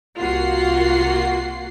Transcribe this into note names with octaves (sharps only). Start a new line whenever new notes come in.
C2 A#3 F4 F#4 F#5 C7